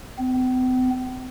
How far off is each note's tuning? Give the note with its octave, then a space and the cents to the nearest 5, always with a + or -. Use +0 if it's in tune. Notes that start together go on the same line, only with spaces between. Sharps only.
C4 -45